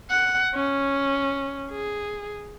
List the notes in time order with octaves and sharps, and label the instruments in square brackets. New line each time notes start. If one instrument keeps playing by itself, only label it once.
[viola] F#5
C#4
G#4